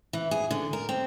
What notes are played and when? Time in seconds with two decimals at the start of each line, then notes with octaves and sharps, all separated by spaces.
0.13 E3
0.31 G#4
0.51 D3
0.73 A#4
0.89 C4